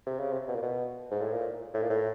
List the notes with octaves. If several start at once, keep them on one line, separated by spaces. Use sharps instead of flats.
C3
C#3
C3
B2
A#2
B2
G#2
A2
A#2
A2
A#2
A2